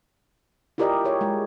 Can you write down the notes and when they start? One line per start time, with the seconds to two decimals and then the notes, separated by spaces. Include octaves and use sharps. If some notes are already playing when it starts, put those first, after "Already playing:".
0.78 E4 F4 G4 A#4 D5 D#5
1.04 E4 G#4 C#5 E5
1.21 G#3